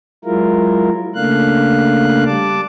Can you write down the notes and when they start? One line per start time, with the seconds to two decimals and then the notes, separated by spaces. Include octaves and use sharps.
0.25 F#3 G#3 E4 F4 A#4
1.15 C#3 A3 A#3 D4 F5 F#6
2.25 G3 A5 D6